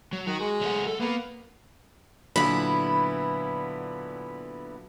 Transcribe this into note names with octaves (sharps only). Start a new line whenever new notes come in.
F#3
D#3 F#4
G#3
F#3 A3 F#5
A4
A#3 B3 A#4
A#2 D3 F#3 B3 E4 B5